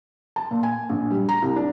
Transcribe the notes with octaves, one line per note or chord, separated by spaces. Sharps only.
A5
A#2
G#5
A#1
G3
A#5
C2
D4